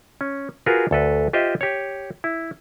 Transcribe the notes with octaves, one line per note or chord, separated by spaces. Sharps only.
C#4
F4 F#4 G#4 A#4 B4
D2 A4 B4
F4 G4 C5 D#5 E5
G4 C#5
E4